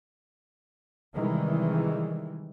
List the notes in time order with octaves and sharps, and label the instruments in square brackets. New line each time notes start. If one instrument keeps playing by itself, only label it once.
[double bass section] C3 D#3 E3 G3 G#3